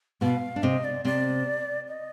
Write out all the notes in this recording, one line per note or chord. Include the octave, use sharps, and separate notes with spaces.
B2 B3 F5
D4
C3 C4 D#5
D5
C3 C4 D5
D#5